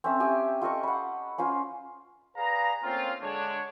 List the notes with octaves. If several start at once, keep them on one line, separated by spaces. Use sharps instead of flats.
C4 C#4 A4 E5
G4 E5 G#5
F4 A4 D#5 C#6
F#5 B5
C#4 F4 C5
G#4 B4 D5 F5 A#5
A3 A#3 C4 C#4 F4
D3 G#3 D4 C#5